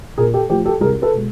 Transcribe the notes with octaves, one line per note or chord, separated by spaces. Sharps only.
A#2 G#4 A#4
G4 A4
F3 A3 G4
G4 A4
C2 G#4 A#4
A4 B4
B2 G#3